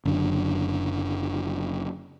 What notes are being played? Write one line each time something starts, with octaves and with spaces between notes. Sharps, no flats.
F#1 F#2 D3